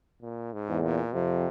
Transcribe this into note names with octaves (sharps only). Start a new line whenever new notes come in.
A#2
G#2
E2
A#2
F2 C3